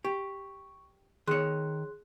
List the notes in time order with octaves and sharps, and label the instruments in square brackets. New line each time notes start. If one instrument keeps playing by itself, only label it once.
[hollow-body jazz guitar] G4 [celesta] C#6
[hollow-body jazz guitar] D#3 C#5 [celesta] G#4 C6 F#6